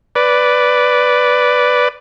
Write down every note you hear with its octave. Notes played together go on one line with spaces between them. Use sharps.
B4 D5